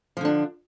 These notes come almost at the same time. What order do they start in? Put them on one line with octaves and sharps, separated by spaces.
F3 D3 D4